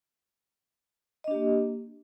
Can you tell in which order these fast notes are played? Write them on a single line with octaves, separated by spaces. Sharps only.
D#5 D4 G4 A#3